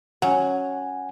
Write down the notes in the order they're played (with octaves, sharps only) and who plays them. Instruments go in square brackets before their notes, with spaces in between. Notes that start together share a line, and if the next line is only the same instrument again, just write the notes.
[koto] F#3 [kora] C#4 [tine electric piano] F#5 G#5